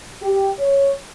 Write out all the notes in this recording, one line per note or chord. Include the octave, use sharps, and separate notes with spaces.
G4
C#5